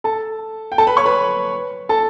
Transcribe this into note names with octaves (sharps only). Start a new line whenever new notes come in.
A4 A5
G5
A4 A5
B4 B5
C#5 C#6
B4 B5
A4 A5